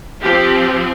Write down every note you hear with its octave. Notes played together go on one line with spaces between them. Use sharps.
F3 C4 G4